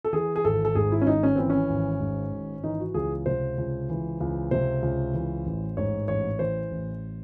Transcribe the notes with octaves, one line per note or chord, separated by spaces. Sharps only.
A4
E3 G#4
G#4
G#1 A4
A4
G#2 G#4
E4
C#4
G#1 D#4
C#4
E3 C4
C#4
G#1
G#2
G#1
E3 D#4
F#4
C#2 G#4
C3 C5
C#2
E3
C#2
C3 C5
C#2
E3
A1
G#2 C#5
A1 C#5
E3 C5
A1